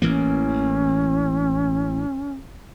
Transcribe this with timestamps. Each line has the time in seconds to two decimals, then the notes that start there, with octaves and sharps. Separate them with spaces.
0.02 A1 E3 A#3 C#4